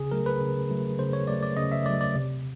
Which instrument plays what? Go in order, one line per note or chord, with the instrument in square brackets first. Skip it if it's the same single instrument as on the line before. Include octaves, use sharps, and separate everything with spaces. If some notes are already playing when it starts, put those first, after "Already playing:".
Already playing: [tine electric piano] C#3 G#4
F#3 A3 A#4
B4
C#3
F#3 A3
C#3 C5
C#5
F#3 A3 D5
D5
C#3 D#5
E5
F#3 A3 D5
D5
C3